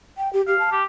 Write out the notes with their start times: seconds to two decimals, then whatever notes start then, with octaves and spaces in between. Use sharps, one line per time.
0.17 G5
0.33 G4
0.47 G4 F5
0.59 A5
0.72 G4